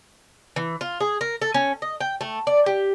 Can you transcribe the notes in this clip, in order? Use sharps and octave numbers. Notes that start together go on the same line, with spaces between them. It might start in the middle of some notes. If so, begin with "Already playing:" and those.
E3
F4
G#4
A#4
A4
C#4
D#5
G5
A3
D5
G4